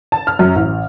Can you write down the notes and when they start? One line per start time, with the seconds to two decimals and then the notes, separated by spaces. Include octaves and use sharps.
0.12 A5
0.27 F6
0.39 F#2
0.55 A1